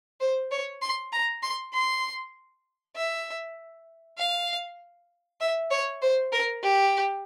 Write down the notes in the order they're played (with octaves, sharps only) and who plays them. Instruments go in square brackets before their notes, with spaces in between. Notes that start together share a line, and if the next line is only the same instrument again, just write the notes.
[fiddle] C5
C#5
C6
A#5
C6
C6
E5
F5
E5
C#5
C5
A#4
G4